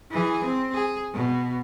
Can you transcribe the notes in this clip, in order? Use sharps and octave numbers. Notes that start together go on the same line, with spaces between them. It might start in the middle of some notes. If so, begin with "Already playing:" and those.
E3 G#4
C4
G#4
B2